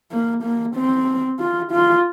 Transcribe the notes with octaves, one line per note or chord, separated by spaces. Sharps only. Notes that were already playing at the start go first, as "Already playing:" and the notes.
A#3
A#3
C4
F4
F4